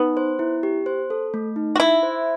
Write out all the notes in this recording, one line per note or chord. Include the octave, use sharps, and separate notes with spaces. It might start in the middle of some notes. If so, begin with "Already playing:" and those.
Already playing: B3 D#4
C5
E4
G4
C5
A4
A3
D#4
F#4
E4 E5
C5